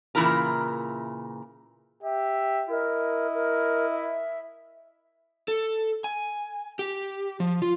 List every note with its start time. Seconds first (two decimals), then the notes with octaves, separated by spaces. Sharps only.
0.15 A#2 C#3 E3 E4 A#4 A#5
2.02 G4 E5
2.69 E4 A#4 D#5
3.34 A#4
3.92 E5
5.48 A4
6.04 G#5
6.79 G4
7.40 F3
7.62 F4